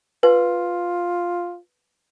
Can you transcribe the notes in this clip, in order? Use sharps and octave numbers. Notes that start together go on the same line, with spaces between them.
F4 B4